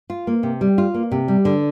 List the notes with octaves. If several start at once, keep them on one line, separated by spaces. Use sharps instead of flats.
F4
A#3
C3
G3
F4
A#3
C3
G3
D3